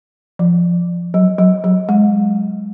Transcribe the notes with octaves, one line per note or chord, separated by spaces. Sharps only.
F3
F#3
F#3
F#3
G#3